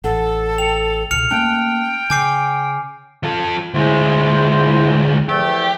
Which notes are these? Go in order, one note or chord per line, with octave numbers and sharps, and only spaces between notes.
A1 A4 F#5
G5 C#7 F7
C#2 B2 F6 C#7 F7
A3 A#3 C#4 G5 A5 F#6
C#3 G#5 D6 G6 C7
F3 A4
D2 G#3 E4 C5
E2 F3 A3 G4